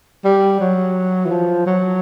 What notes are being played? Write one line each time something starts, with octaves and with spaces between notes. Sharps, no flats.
G3
F#3
E3
F3
F#3